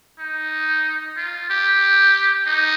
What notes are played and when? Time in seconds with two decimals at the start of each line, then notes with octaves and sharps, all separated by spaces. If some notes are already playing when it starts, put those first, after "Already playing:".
0.19 D#4
1.16 F4
1.50 G4
2.47 D#4